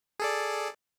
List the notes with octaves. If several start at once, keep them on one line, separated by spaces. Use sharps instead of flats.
G#4 A4 D5